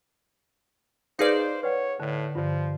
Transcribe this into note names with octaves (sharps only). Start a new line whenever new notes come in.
D#4 G#4 B4 C5 D5 F5
B4 C#5 F#5
A2 D3 A5
G2 D3 F3 F4